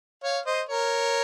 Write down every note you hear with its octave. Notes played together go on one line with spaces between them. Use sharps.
C#5 F5
C5 D#5
A#4 C#5